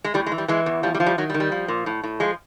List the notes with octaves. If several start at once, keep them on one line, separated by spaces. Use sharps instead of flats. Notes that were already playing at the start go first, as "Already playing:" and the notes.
G#3
A2 G3
G#3
E3
G3
E3 G#3
E2
F3 G3
G3
F3
G3
D#3 F#3
G3
D#3
G3
F3
A#2
A2
A2
F3 G#3